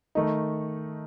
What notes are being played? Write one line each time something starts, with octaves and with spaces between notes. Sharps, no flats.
D#3 A3 D#4